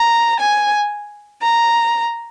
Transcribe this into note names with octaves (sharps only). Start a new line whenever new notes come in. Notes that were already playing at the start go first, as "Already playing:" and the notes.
Already playing: A#5
G#5
A#5